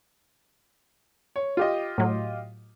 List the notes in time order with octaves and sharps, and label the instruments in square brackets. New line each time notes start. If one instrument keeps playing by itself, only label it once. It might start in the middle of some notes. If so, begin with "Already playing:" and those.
[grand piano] C#5
F4 G4 D#5
[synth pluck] A2 F#3